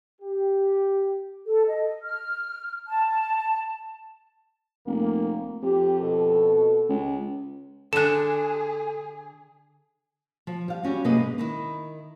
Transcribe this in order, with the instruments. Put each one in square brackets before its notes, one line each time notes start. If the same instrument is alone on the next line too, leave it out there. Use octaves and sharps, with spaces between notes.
[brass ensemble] G4
[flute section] A4
D#5
F6
A5
[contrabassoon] F1 [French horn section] A#3
[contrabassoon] F2 [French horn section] G4
[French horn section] B2 A4
[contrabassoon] C#2
[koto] D3 D4 [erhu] G#4 [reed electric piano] A4 [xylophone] F#6 E7
[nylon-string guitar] F3
G3 F5
E3 G3 C#4 F#4
F#2 C3 A#3 G#4 B4 D#5
G#2
D#3 D#4 E4